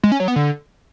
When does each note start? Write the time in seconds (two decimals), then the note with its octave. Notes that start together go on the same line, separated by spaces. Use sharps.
0.04 G#3
0.12 C#4
0.20 F#3
0.28 B3
0.36 D3